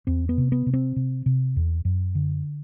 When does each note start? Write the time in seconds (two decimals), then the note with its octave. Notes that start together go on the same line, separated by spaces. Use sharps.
0.07 E2 C4
0.29 B3
0.38 C3
0.52 B3
0.66 C3
0.73 C4
0.96 C3
1.26 C3
1.56 E2
1.85 F#2
2.15 D3